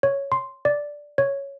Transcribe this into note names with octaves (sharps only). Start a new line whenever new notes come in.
C#5
C6
D5
C#5